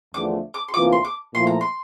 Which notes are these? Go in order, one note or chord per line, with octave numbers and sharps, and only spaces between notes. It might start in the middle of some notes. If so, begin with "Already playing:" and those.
E2 D3 F3 A3 D4 D6
D6
C6
D2 C3 E3 A#3 F4 D6
C6
D6
A#2 F3 A3 E4 C6
A#5
C6